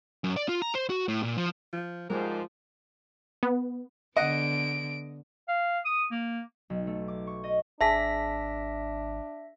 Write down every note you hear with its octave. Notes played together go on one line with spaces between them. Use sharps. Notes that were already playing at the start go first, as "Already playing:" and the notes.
F#2
D5
F4
A#5
C5
F#4
A2
A#2
F3
F3
G#2 F3 G3 G#3 A#4 C5
B3
D3 B3 D#5 F#5 D7
F5
D#6
A#3
B1
A3
D6
C#6
D#5
G#1 D4 G#4 E5 G#5 A5 A#6 B6